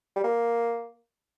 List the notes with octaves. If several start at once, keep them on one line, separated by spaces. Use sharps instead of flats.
G3
A#3